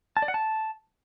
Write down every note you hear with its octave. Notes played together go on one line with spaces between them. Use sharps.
A5
D5
F#5
A5